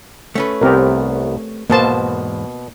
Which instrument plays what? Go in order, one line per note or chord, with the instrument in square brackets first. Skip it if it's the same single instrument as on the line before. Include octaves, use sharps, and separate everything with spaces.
[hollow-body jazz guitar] A3 C#4 B4
[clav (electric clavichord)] C2 B3 [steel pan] C4 G4 A#4
[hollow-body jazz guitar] E2 G#2 C5 [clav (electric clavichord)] B2 [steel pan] A#3 A5